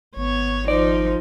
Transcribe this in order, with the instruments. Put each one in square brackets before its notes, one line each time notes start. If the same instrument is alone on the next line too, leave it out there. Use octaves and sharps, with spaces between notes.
[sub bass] G#1 [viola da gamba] B3 C#5
[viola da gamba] F3 D#4 [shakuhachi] C5 [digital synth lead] D5